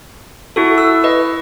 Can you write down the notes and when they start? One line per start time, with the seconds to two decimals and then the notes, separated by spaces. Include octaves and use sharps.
0.56 E4 F#4 A4
0.78 E6
1.04 B4 D#5